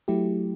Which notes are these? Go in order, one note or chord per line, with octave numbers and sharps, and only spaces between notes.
F#3 A3 E4 G4